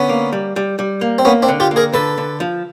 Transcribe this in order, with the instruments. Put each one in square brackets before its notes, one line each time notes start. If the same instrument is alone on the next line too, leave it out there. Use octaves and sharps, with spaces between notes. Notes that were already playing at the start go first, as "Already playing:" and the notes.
Already playing: [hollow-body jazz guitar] D3 [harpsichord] B3 C#4
[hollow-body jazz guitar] A#3
G3
G3
G3
A#3
[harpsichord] C4
[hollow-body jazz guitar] A#3 [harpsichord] B3 C#4
[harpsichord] C4 D4
[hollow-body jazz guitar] D3
[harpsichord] F4 G4
[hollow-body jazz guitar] A#3
[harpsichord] G#4 A#4
[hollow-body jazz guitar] D3 [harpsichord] A4 B4
[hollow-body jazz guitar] D3
F3